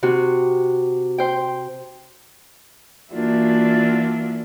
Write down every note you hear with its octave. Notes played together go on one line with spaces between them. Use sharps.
C3 F#4
C5 G5
E3 A#3 D4 F4 F#4 E5